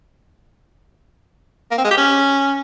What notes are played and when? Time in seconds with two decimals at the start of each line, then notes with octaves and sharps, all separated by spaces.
1.71 A#3
1.78 C4
1.84 G#3
1.91 G4
1.97 C#4